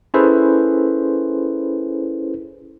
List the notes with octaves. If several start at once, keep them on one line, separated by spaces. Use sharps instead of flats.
C#4 E4 G#4 A4 B4 C5